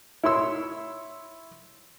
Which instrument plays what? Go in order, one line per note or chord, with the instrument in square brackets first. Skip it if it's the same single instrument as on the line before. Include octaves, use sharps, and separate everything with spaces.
[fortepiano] E4 C#5 C6 E6